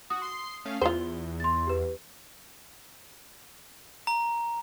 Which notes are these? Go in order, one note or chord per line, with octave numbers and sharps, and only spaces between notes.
F#4 D#6
C6 C7
A3 C#4 F5
E2 F4 C5 G7
C6 A6
G4 B4
A#5